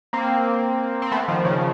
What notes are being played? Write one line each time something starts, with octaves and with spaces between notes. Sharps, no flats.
A#3 C4
C4
A3 B3
D#3 F3
C#3